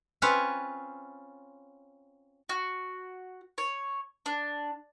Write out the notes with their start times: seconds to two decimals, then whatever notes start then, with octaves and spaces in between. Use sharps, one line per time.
0.22 C4 C#4 F4 B4 C#5
2.49 F#4
3.58 C#5
4.26 D4